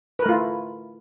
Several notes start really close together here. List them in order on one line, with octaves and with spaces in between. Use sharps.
B4 A#4 A3 F4 E4